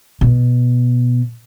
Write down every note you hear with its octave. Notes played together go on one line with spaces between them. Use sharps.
B2